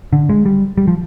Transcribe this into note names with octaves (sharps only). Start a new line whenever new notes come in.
D3
G#3
G3
G3
F3